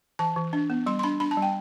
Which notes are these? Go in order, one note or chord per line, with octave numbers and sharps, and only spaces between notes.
E3 A5
E3
D4
B3
G3 C6
C6
D4 B5
D4 B5
A5
G3 G5